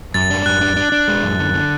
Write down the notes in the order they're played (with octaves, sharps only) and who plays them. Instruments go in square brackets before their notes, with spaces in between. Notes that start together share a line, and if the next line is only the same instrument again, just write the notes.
[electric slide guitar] F#2 [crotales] A6
[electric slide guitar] D4
[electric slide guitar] F#2 [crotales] F#6
[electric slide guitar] D4
D4
D4
G#3
F#2
D3
D3